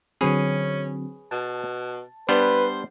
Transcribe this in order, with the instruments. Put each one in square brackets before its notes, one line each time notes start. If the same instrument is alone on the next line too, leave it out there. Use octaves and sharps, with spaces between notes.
[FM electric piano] D3 F#3 C4 [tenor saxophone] C#4 [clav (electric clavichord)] G#4 B4 C#5
[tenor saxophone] B2 [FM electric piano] A5
[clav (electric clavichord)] G3 B3 D4 [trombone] B4 [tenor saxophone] C5